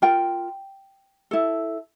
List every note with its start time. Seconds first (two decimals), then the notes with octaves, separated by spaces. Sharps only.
0.02 F4 A#4 G5
1.31 E4 A4